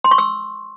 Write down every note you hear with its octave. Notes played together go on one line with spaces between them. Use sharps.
C6
C#6
E6